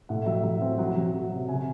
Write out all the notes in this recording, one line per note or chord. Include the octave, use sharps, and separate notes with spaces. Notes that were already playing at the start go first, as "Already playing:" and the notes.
A2 F#5
F#3 E5
F#3 E5
C4
F#3 F#5
F#3
F#3
C3
C#3 G#5